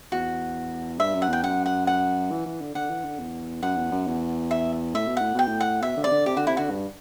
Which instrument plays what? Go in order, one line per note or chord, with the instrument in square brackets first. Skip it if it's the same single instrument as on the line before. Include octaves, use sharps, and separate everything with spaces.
[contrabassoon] E2 [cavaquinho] F#4
[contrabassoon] G2 [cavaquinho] E5
[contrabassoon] F#2
[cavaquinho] F#5
[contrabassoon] E2 [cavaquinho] G5
[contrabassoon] F#2 [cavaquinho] F#5
[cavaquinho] F#5
F#5
[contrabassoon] E3
E3
D3
[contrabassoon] D3 [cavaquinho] F#5
[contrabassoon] E3
D3
E2
[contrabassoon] F#2 [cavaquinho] F#5
[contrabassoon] E2
F#2
E2
[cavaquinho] E5
[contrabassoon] A2 [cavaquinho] E5
[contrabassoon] B2
[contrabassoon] A2 [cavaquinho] F#5
[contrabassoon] B2 [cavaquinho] G5
[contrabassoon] A2
[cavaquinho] F#5
[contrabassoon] B2 [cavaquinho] E5
[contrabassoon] D3
[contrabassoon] C3 [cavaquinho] D5
[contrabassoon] D3
[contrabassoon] C3 [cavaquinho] G4
[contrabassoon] D3 [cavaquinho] F#4
[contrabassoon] C3 [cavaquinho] E4
[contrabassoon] D3 [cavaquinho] F#4
[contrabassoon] G2